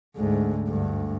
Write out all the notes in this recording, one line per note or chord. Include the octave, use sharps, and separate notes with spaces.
D2 G#2
D2 G2